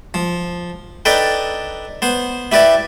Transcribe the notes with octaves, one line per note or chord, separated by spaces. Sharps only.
F3
D4 D#4 A4 B4 G5
B3 C5
E4 G4 B4 D5 E5